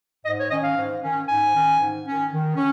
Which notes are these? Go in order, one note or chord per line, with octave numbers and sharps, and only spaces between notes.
G#2 D#5
C#5
D#3 C#4 D#5
F5
G#2
D#3 C#4
G#2 G#5
D#3 C#4
G#2
D#3 C#4
D#3
C#4